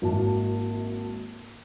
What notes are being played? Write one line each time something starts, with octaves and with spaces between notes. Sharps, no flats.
G#1 A#3 E4 F#4 A5